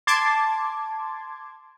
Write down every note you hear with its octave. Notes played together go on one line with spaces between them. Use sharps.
A5 C6 D6 G#6